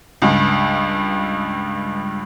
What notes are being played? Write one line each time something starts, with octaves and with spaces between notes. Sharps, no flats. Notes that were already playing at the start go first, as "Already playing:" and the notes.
C#2 G2